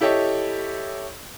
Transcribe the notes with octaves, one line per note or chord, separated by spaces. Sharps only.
E4 G4 A4 C#5 D#5